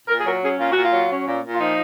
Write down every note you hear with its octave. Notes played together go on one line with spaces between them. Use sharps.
A#2 A#4
G#4
F#3 A#4
C#4 G#4
A#2 F4
F#4
A#2
F4
F#3
C#4
A#2
A#2
F4
F3 D#4